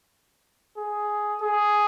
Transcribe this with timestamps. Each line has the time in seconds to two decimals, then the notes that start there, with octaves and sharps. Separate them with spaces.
0.78 G#4
1.41 G#4